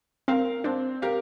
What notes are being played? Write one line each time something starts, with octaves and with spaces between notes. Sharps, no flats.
C4 A#4 F5
C4 D4
G4 A#4 F5